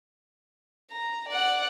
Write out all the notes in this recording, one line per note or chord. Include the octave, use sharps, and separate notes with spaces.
A#5
D5 F#5